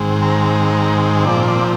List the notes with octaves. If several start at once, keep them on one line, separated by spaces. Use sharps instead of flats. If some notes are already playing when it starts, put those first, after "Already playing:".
Already playing: G#2 D#3 G#3 C4
A#5
A#2 F3 C4 D5
D5